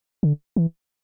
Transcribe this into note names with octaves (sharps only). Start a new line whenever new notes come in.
D3
E3